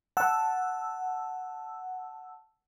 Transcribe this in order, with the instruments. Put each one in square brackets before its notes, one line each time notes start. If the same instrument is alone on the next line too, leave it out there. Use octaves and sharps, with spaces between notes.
[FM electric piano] F#5 A5 E6